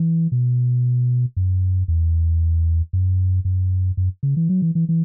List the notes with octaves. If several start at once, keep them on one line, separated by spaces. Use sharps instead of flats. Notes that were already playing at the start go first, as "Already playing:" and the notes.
Already playing: E3
B2
F#2
E2
F#2
F#2
F#2
C#3
E3
F#3
E3
E3
E3